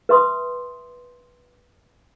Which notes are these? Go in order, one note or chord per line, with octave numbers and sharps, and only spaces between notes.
B4 E5 C6 D#6